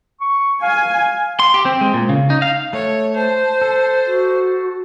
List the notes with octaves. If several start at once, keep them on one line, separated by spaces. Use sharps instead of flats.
C#6
F5 G#5
C6
G4
C4
G#3
A#2
C#3
D#4
F5
A3 C#5
C5 A5
A4
F#4